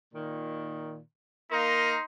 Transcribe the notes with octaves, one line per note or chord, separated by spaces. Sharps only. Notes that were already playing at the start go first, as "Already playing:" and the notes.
A#2 D#3
A#3 D#4 A#4 C6